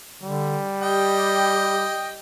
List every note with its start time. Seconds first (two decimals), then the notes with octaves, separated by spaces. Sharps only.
0.22 D3 G3
0.81 G4 D#5 G5